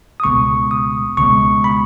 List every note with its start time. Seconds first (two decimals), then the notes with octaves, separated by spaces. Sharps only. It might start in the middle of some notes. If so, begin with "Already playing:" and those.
0.20 D#6
0.24 C#2 B2 G#3 C#6
0.71 D#6
1.17 C#2 B2 G#3 C#6
1.64 B5